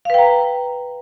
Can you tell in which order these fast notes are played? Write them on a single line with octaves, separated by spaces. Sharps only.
F5 B4 G5 A#5